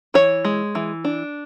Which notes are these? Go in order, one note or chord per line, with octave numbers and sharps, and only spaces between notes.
E3 C#5
G#3
E3
D4